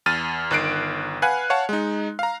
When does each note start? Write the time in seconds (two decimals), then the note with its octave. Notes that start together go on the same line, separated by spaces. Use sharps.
0.06 E2 F6 A6 D#7
0.51 G1 D#3 F#6 C7 D7
1.22 B4 F5 F#5 G#5 F#6
1.50 C#5 F5 F#5 A5
1.69 G#3 D#4
2.19 F5 A#5